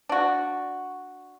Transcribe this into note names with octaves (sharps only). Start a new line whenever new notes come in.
D4 F#4